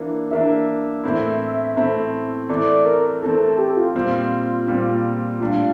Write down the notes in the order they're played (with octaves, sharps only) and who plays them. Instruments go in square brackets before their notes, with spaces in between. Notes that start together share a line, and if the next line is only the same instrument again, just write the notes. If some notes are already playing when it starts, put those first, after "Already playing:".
Already playing: [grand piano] E3 A#3 D4
[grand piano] E3 A#3 D4 [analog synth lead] E5
[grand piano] A2 E3 A3 C4 E4
A2 E3 A3 C4 E4
[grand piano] E3 A3 C4 [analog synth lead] D5
[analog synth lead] A#4
[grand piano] E3 A3 C4 [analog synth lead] A4
[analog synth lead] A4
G4
F4
[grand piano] A#2 G3 C4 [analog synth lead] F4
[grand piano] A#2 G3 C4
[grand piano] A2 G3 D4 [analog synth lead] F4